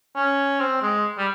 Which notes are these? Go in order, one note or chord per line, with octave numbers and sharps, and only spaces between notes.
C#4
C4
G#3
G3